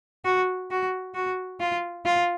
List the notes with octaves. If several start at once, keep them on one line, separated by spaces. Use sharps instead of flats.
F#4
F#4
F#4
F4
F4